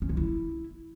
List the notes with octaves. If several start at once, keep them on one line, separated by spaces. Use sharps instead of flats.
C#4
G#3
E4